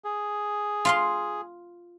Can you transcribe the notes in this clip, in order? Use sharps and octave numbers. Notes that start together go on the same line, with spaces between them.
G#4
F4 F5 C6